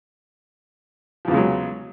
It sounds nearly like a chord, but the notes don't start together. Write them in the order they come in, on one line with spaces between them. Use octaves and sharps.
F3 E2 C#3 G#3 F#3